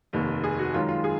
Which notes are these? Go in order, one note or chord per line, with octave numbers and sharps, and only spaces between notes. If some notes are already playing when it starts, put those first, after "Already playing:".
F1 D#2 D#3
G#4
F#4
F#2 D#3 G#3 F4
F4
G#4